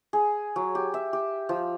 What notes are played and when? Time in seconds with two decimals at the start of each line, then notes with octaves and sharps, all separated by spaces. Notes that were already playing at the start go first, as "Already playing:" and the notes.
0.13 G#4
0.56 F#3
0.75 G4
0.94 E5
1.13 G4
1.49 F3